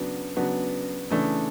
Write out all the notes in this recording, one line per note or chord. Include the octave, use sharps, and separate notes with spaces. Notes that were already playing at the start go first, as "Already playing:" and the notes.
Already playing: C#3 F#3 B3 D4
C#3 F#3 B3 D4
C#3 E3 A3 D4